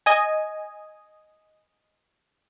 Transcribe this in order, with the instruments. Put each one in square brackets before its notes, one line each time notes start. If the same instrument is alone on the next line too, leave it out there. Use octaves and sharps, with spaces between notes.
[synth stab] D#5 G#5